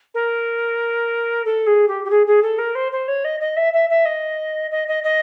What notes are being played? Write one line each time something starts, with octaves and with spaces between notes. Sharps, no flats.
A#4
A4
G#4
G4
G4
G#4
G#4
A4
A#4
C5
C5
C#5
D#5
D#5
E5
E5
E5
D#5
D#5
D#5
D#5